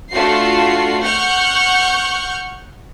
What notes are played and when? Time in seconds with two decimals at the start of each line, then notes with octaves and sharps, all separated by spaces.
0.11 A3 D4 F4 F#4 C7
1.02 F#5 C#6 F6 G6